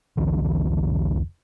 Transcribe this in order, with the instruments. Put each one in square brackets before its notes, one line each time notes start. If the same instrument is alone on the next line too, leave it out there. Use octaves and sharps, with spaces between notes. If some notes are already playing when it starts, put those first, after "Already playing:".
[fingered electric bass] F1 C2 D3 E3